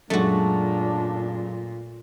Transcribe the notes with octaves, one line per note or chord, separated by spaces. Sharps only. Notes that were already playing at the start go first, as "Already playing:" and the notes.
F#2 A#2 G#3 A3 D4 F#4